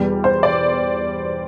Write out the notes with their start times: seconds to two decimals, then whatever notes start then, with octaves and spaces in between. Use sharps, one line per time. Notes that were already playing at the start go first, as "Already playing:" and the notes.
Already playing: E2 B2 G3
0.24 C5
0.43 D5